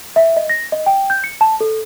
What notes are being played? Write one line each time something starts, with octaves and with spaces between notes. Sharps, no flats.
E5
D#5
A#6
D#5
G5
G6
C#7
A5
A4